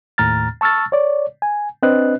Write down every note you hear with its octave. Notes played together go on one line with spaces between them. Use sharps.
D#2 A2 A#5 F6 A6
A5 C#6 E6 F6 A6
C#5 D5
G#5
C4 D4 B4 D#5 F#6